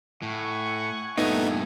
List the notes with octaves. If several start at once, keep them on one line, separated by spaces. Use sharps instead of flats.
A2 F#5 G#5 C#6
G2 A#2 A3 B3 D#4 G#6